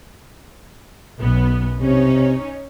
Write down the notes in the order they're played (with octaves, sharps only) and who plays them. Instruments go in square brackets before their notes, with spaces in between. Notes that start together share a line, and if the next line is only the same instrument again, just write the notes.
[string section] B1 F#2 B3
[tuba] C3 [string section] C#4 D#4 C#5